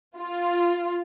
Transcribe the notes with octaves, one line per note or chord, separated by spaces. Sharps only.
F4